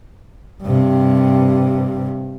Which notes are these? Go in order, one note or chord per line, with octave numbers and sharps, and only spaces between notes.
G2 C3